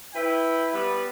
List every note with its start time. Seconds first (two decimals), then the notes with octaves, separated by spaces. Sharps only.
0.14 E4 B4 G5
0.73 G3 B3 B4